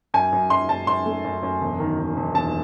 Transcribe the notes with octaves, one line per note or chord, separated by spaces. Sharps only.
F#2 G#5
F#2
F#2 C6
F#2 A5
F#2 C6
A3
F#2
F#2
E1
D#3
D#3
E1
E1 A5